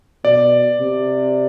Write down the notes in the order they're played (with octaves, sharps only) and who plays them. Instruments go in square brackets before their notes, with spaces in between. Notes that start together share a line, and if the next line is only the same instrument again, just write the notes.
[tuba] B2 [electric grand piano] D5
[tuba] C3